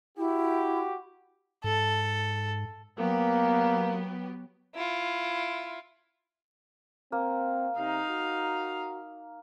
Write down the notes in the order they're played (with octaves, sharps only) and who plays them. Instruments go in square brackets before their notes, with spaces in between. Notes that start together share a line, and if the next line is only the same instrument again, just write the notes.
[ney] E4 [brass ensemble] F#4 G4
[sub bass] G#2 [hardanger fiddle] A4
[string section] F#3 B3 G4 [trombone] A#3
[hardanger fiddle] E4 F4
[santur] A#3 [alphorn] C4
[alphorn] C3 [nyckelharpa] D#4 F5
[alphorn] F#4